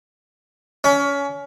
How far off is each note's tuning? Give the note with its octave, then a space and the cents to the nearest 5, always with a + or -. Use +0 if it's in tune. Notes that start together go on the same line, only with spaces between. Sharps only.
C#4 +25